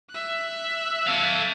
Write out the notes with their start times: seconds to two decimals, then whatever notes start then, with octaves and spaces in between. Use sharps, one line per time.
0.10 E5 F#6
1.07 A4 F5